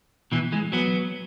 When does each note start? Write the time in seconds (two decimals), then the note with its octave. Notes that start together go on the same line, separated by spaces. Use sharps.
0.32 B2 E3
0.52 E3 G#3
0.72 F#3 B3